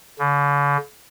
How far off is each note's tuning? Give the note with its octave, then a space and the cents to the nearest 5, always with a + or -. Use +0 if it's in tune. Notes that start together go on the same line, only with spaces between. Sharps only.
D3 -45